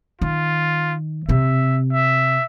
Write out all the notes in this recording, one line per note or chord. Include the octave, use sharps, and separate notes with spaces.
D#3 F4
C3 C4 E5
E5